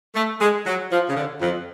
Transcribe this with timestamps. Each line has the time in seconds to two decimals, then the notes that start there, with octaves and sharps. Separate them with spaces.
0.15 A3
0.41 G#3
0.66 F#3
0.92 F3
1.09 C#3
1.16 D3
1.41 F2